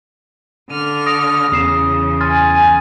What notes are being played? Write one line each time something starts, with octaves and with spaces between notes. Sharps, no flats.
D3 F6 D#7
D#6 A#6 D7
E2 C#3 D#6 C7 E7
G#5 C6 F6 A6